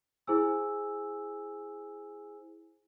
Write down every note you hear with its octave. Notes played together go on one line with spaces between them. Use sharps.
E4 G#4 C5 G#5 E6